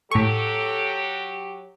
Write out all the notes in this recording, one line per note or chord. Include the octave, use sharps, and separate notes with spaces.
A2 F#3 G4 A4 C#6